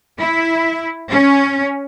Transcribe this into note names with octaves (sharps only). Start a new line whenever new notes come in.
E4
C#4